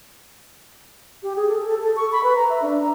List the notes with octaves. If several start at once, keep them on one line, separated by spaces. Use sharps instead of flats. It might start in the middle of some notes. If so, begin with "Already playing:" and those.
G4
G#4
A4
A4
A4
C#6
B5
B4
A#5
E5
D4
A#5